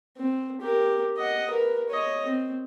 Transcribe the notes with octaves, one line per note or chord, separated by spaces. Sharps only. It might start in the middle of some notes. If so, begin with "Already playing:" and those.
C4
G4 A#4
D#5 F#5
A#4 B4
C#5 D#5
C4